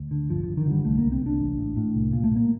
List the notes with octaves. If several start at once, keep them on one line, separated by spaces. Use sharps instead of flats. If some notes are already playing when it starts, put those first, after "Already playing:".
Already playing: D2
D3
G1 F3
G1 F3
D#3
D3
G3
C2 A3
A#3
C2
C4
C2
D4
A1
A2
A2
C2
A#2
A3
A#2
A#3